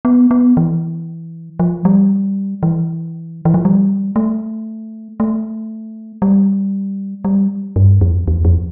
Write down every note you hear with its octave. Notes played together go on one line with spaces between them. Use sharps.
B3
B3
E3
F3
G3
E3
E3
F3
G3
A3
A3
G3
G3
G2
F2
E2
F2